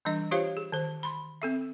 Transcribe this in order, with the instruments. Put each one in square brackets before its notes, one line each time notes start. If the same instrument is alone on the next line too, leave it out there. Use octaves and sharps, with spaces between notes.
[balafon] E3 G3 D4 D#5
F4 G4 C5 C#5 F5
G#4
D#3 C5
B5 C6
C4 A4 E5